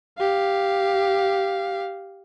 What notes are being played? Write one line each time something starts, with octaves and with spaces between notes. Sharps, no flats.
G4 F5